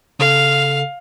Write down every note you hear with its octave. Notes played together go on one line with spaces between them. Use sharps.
C#3 A4 F5